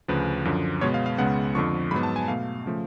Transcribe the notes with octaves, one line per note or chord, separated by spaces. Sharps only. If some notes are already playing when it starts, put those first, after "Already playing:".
D2 C#3 F3 B4
F#2 D3 F3
B2 G#3 B3 C#5
F5
F5
C#2 C#3 G#3 B3 F#5
F2 D3 F3 C#6
G#2 F#3 B3 B5
A5
G#5
B2 A3 F5
C#3 F3 A3